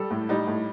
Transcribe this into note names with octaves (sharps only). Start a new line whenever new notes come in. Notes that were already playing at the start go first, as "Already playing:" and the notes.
Already playing: G3 A4
A2
G3 D#4
A2